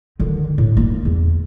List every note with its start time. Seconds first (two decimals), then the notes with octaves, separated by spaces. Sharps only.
0.20 D3 D#3
0.58 A2
0.77 A#3
1.05 E2